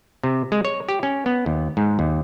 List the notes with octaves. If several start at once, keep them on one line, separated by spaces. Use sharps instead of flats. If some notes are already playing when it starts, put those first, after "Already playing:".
C3
G#3
C#5
G4
C#4
B3
D#2
G#2
D#2